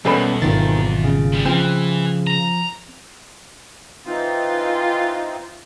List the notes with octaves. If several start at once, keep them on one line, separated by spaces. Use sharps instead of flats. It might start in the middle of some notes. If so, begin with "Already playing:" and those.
B1 E2 G3 A#3 B3 C#4 A4 B5
G#1 D#3 C4 F4 A6
C#3
A#2 G3
E3 F3 C4
A#5
E3 C4 D#4 F4